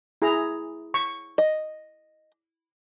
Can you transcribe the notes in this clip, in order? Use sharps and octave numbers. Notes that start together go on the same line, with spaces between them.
E4 G#4 A#5
C#6
D#5